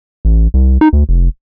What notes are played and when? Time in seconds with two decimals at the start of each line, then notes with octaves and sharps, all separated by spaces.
0.25 A1
0.54 C2
0.81 D#4
0.93 D2
1.09 F1